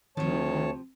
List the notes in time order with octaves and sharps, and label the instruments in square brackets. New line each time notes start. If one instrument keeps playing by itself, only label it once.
[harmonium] D2 C#5 A5 [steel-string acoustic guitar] C3 F3 [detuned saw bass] D#3